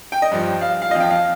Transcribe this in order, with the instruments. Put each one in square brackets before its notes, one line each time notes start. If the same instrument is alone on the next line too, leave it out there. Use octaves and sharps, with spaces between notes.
[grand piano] G5
D#5
G2 F3
F5
F5
F3 D#5
F2 F5
G5
F5